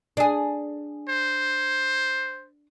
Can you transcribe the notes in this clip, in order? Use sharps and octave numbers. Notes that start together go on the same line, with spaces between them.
D4 G#4
C5